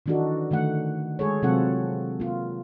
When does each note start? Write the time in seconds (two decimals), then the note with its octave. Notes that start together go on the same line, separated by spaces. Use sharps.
0.06 D#3 E3 D4 D#4 F#4 A4
0.51 D3 D#3 A3 F#5
1.19 G#3 G#4 A4 C#5
1.42 C3 F#3 C4 F4 A4 F#5
2.20 A#3 F4